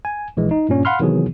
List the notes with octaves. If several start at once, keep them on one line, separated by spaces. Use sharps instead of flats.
G#5
A#1 E3 G#3
D#4
G2 A#2 C#4
F5 F#5 B5 C6 F6
C3 D#3 E3 F#3 B3 G#4